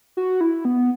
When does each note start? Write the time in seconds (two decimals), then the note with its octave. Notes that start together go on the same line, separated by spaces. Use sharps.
0.17 F#4
0.41 E4
0.65 B3